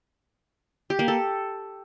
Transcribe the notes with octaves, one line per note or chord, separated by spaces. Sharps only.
G4
A#3
A4